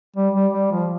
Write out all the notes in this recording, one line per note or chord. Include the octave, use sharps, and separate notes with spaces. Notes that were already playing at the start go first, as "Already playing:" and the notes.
G3
G3
G3
F3